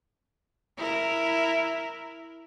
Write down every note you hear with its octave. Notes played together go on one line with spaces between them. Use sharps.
E4 A#4